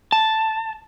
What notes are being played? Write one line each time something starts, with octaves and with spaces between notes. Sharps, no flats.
A5